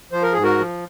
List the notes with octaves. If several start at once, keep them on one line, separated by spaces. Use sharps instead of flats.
F3 C5
A#4
G#2 G#4
F#4 A#4
F3